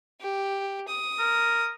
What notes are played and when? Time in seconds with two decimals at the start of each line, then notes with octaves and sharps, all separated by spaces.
0.21 G4
0.88 D#6
1.19 A#4